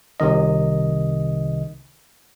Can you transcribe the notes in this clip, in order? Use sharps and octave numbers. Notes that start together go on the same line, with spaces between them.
C2 C3 D#3 D#5